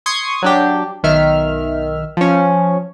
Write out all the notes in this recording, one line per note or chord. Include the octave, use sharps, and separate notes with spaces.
C6 C#6 D#6 G#6 C7
F#3 D4 G4
B1 D#3 E5 F6
F3 C#4